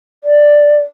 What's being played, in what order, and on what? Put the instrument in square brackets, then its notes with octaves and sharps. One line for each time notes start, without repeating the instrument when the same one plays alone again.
[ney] D5